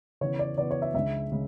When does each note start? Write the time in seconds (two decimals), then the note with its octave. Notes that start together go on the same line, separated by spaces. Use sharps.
0.21 C#3 E3 B3 C#5
0.39 D5
0.58 C#3 E3 B3 D5
0.71 C#5
0.82 E5
0.94 C#2 C#3 G#3 D4 E5
1.32 C#3 G#3